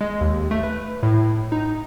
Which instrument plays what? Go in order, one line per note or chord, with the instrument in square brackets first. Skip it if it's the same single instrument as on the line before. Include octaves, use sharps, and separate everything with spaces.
[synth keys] G#3
D#2
A3
B4
A2
D#4